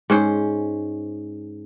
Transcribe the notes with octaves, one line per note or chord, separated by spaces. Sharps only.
G#2 C#4 C5